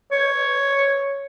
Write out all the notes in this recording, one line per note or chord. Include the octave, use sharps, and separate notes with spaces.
C#5